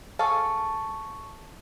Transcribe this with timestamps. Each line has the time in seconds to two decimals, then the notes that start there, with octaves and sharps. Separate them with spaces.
0.19 G#4 A4 F5 A5 C#6